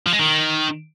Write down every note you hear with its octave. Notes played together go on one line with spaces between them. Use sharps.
F3
G#3
D#3